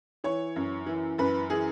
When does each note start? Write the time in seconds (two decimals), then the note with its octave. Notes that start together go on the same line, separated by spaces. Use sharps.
0.24 E3 C#5
0.56 F#2
0.86 E3
1.18 F#2 B4
1.50 E3 G#4